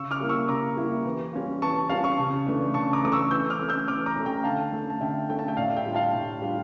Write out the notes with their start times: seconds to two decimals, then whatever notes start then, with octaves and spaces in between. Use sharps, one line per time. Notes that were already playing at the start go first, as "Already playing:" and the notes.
Already playing: C#3 C#6 E6
0.11 D6 F6
0.20 G3 A#3 E4
0.29 C#6 E6
0.48 C#3 A#5 D6
0.76 G3 A#3 E4
1.05 E3
1.33 G3 C#4 F4
1.62 E3 A5 C#6
1.89 G3 C#4 F4 F5 A5
2.04 A5 C#6
2.19 C#3
2.47 E3 A3 D4
2.74 C#3 A5 C#6
2.93 A#5 D6
3.03 E3 A3 D4 D6
3.12 C#6 E6
3.31 E3 E6 G6
3.50 D6 F6
3.59 A3 C#4
3.69 E6 G6
3.88 E3 D6 F6
4.06 A#5 D6
4.16 A3 C#4
4.25 G5 A#5
4.44 D3 F5 A5
4.73 A3 C#4
4.90 A5
5.01 D3 E5 G5
5.29 A3 C#4 G5
5.39 A5
5.48 E5 G5
5.57 A2 D5 F5
5.76 E5 G5
5.86 G3 D4 F4
5.95 F5 A5
6.13 A2
6.42 G3 D4 F4